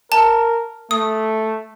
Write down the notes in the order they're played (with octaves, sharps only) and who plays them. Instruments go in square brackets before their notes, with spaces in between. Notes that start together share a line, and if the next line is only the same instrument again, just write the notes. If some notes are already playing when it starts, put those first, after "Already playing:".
[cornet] A#4 [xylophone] A5
[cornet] A3 [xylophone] D#6